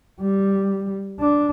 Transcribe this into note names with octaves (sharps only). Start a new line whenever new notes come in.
G3
D4